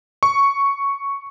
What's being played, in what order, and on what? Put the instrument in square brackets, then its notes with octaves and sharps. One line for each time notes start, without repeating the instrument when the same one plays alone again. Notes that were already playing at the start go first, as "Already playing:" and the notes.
[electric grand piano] C#6